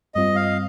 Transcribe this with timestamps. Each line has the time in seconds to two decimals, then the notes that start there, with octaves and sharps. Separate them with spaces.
0.15 G2 G3 C4 F4 D#5
0.36 F5